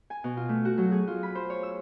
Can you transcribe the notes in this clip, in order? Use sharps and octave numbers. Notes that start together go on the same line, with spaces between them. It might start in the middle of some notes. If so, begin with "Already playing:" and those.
G#5
B2
F4
A3
F#4
F#3
G#4
F4
B5
C5
C#5
E6